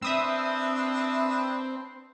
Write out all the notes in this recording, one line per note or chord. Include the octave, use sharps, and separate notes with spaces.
C4 D4 B4 E5 D#6 E6